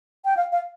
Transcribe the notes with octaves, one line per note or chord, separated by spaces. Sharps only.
G5
F5
F5